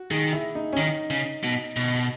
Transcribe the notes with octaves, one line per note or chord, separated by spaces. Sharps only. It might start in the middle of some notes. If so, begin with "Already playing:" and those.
Already playing: F#4
D#3 G#4
E4
D#4
C#4
D#3 D#4
C#3
B2
B2